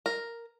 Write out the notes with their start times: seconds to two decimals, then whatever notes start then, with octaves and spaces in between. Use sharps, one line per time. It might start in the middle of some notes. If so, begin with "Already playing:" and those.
0.06 A#4